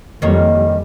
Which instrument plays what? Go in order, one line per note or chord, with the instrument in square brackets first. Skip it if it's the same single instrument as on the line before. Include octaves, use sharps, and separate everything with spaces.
[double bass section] F2 E3 G3 [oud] D#3 A#3 C#5